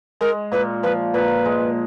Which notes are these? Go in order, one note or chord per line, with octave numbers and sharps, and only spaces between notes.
G#3 A#4
A#2 B4
F3 B4
A#2 B4
G#3